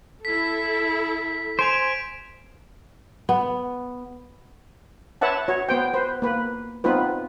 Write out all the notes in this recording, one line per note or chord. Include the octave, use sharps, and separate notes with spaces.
E4 A4 B6
C5 G#5 D7 F7
B3
B4 C#5 E5 F#5 A5
F#4 C#5
B3 C5 G5
B4 C5
A#3 B4
B3 C4 D#4 F4 B4